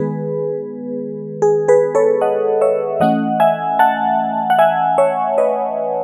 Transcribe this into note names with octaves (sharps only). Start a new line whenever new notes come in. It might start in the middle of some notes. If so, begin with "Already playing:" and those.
Already playing: D#3 G#3 B3 G#4 B4
G#4
G#4 B4
A4 C#5
D#5 F#5
C#5 E5
E3 A3 C#4 D#5 F#5
E5 G#5
F#5 A5
F#5
E5 G#5
C#5 E5
B4 D#5